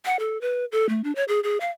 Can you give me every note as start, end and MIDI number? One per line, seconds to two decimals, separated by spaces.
0.05 0.19 78
0.19 0.40 69
0.41 0.65 71
0.72 0.89 69
0.89 1.01 57
1.04 1.14 62
1.15 1.24 73
1.28 1.40 68
1.44 1.58 68
1.60 1.70 77